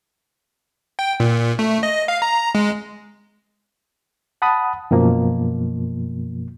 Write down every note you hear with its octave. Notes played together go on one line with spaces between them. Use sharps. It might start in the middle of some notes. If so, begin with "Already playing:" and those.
G5
A#2
A3
D#5
F5
A#5
G#3
F#5 A5 B5 D#6
F#2 B2 F3 A#3